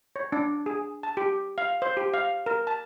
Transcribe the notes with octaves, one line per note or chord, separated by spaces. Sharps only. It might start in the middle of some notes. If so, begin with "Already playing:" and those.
C#5
D4
G#4
A5
G4
F5
C5
G4
F5
A#4
A5